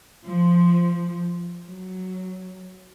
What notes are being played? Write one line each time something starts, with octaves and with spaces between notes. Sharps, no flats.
F3
F#3